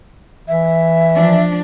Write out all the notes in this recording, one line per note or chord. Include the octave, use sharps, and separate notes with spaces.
E3 E5
F3 D4